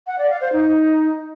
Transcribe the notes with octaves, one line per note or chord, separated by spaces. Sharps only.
F#5
D5
F5
C5
D#4